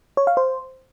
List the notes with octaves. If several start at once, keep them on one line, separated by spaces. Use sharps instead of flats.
C#5
F5
C5